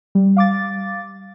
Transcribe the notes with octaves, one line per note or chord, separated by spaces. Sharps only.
G3
F5 D6 A6